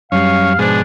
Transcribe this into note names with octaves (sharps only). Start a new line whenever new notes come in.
F#2 G3 C#4 F5
G#2 B2 F3 G#3 D4